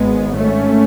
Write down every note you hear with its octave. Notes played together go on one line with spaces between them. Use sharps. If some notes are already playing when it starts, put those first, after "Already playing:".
Already playing: G#1 G#2 G#3 B3
A3 C#4